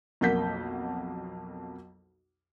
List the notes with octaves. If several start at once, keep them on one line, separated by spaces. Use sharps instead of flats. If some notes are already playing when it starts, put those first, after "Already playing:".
B1 F2 A#3 F#5 G6 B6